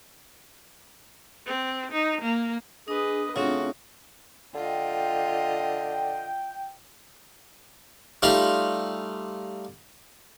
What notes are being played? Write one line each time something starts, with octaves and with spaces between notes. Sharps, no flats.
C4
D#4
A#3
D4 G#4 B4 D#5 D#6
C#3 A3 C4 D4 F4 F#4
D3 F4 D#5 G5
G3 A3 D#4 F4